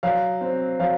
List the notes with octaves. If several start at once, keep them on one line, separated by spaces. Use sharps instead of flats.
F#3 F5
C4
F#3 F5